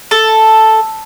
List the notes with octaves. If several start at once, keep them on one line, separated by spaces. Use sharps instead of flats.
A4